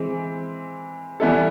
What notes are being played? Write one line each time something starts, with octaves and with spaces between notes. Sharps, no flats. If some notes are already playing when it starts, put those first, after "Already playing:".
Already playing: E3 G#3 C4
E3 G3 B3 E4 A4